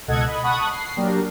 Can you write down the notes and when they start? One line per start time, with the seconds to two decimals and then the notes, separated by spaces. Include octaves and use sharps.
0.08 C#2 B2 A4 D#5 F#5 G#6
0.26 D#5 B5
0.43 F#5 A5 B5 C#6 D#6 F#6
0.72 C7
0.97 F#3 A#3 D4 G4 A#4